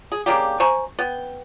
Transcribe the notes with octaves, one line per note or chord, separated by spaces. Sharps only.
G#4
C#3 A#3 D4 G4
C5 G#5 A#5 C#6
B3 G5